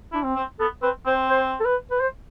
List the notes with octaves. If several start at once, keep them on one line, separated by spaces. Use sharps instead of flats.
D4 E4
C4
C4
B3 A4
C4 B4
C4 C5
C5
A4
B4
B4
C5